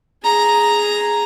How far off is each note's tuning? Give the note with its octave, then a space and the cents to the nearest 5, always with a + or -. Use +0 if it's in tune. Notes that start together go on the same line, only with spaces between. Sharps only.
G#4 +0 A#5 +0